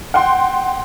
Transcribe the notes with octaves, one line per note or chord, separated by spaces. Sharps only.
F#5 G5 C6